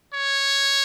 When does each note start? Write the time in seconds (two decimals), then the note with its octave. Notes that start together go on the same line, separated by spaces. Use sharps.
0.14 C#5